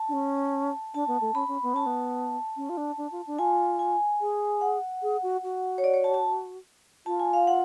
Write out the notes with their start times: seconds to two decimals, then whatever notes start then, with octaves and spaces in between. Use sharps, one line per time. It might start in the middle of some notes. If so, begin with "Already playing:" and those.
Already playing: A5
0.09 D4
0.13 C#4
0.94 D4 A5
1.08 B3
1.21 A3
1.35 C#4 B5
1.48 C#4
1.63 B3
1.74 C#4 A5
1.86 B3
2.57 C#4
2.69 F4
2.77 D4
2.98 D4
3.12 F4
3.27 D4
3.39 F4 G#5
3.79 G#5
4.21 G#4
4.61 F#5
5.03 G#4
5.23 F#4
5.43 F#4
5.78 C#5
5.84 D5
5.94 C#5
6.04 A5
6.14 A5
7.06 F4 A5
7.20 G#5
7.33 F5
7.47 F#5